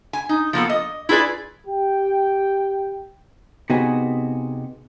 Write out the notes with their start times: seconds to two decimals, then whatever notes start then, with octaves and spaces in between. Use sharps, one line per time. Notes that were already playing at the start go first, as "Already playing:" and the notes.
0.13 G#5
0.29 D#4
0.53 F3 A#3 B3 A4
0.70 D#5
1.09 E4 F4 G#4 B4 D5
1.67 G4 G5
3.70 C3 B3 D#4 F#4 G#4